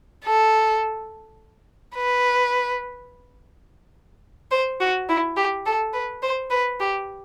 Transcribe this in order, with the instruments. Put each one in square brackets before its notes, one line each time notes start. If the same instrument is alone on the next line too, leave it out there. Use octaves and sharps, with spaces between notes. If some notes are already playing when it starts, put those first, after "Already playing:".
[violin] A4
B4
C5
F#4
E4
G4
A4
B4
C5
B4
G4